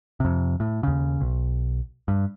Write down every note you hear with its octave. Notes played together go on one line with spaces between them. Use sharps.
F2 C3
A2
D#2 C#3
B1
G2